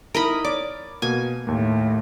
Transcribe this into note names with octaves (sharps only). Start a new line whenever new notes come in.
D#4 E4 A#4 D#5 B5
C#5 D5 D6
B2 A#3 G#5
D#2 A2 A#3